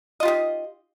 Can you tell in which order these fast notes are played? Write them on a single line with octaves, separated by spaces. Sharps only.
D#5 F4 G4 D#4